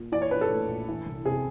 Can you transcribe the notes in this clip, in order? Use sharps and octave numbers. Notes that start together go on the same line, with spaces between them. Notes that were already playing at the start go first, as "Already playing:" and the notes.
Already playing: A#2
E3 D5
C#5
A#1 B4
A4
A2
A#1
E3
C2
C3 G#4